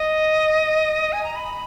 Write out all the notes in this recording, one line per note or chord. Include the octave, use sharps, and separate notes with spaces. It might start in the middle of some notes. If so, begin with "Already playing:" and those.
Already playing: D#5
G#5
A#5
B5